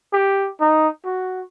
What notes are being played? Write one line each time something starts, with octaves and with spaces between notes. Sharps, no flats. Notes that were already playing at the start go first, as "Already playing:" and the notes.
G4
D#4
F#4